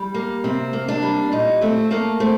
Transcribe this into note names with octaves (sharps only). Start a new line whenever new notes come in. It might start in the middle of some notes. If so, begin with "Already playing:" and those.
Already playing: G3
A#3
C3 C4
A#3
D4
G3
A#2 D#4
A3 C4
A3 A#3
A3 C4